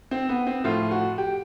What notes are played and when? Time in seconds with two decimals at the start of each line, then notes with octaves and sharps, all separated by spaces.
0.11 C4
0.29 B3
0.47 C4
0.64 A2 F3 F4
0.91 F#4
1.18 G4